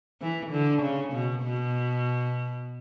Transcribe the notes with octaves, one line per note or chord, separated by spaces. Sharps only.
E3
D3
C#3
B2
B2